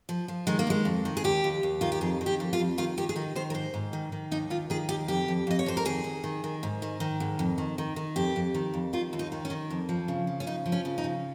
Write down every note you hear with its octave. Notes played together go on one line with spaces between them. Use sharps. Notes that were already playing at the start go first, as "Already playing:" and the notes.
F3
F3
D#3 G#3
A#3
D#3 G#3
F2
D#3
G#4
D#2 G4
D#2
D#2
D#3 F4
G4
F2 G#4
D#3
G4
F2
F4
F2
D#3 F4
D#3 G4
G#4
D#3 A#4
D#3 C5
A#4
G#2 C5
G#2
D#3
D#3
D#2 D#4
D#3 F4
D#3 G#4
D#2 G4
F2 G4
F2
F2 D#5
C#5
F2 C5
A#4
D#3 G#4
D#3
D#3
D#3
G#2
D#3
D#3
G#2
F2
D#3
D#3
D#3
F2 G4
F2
D#3
F2
D#3 F4
D#2
D#4
D#3
C#4
D#3
F2
F3
C#3
F3
C#4
C#3 D#4
F3
C#4
C#3
D#4
C#3